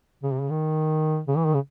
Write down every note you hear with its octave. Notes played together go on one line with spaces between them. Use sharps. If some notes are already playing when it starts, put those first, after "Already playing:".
C#3
C3
C#3
D#3
C#3
E3
D#3
C#3